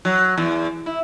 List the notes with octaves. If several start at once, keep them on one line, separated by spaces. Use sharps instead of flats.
F#3
E2
E4